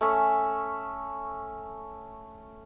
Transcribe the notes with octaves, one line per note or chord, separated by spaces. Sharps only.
A3 C#4 E5